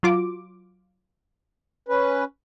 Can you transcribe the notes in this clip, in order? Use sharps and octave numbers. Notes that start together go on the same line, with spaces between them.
F#3 F4 D6
C#4 B4